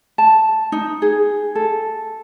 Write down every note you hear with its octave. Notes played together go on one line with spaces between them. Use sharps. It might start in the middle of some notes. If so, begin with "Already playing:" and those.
A5
D#4
G#4
A4